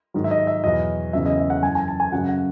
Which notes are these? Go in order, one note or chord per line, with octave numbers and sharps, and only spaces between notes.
G#2 D#3 F#3
E5
D#5
E5
E2 B2 F#3 D#5
E2 C#3 F#3 E5
D#5
E5
F#5
F#2 E3 G#5
G#5
A5
G#5
F#2 C#3 F#3 F#5
F#5